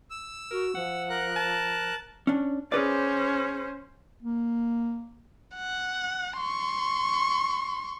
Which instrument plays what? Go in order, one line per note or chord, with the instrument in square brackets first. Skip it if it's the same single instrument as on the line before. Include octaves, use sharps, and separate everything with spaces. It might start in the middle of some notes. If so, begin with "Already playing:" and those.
[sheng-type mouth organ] E6
[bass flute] F#4 [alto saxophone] A#4
[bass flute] F3 [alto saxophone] F#5
[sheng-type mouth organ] A#4 F#6
[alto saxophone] A5
[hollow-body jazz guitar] C#4 D4
[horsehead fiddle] C#4 C5 [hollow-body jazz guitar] G#4 B4 D5
[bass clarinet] A#3
[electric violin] F#5
C6 C#6